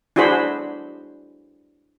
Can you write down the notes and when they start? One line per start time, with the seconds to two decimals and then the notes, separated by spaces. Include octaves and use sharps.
0.16 D4 E4 F#4 G#4 C5 B5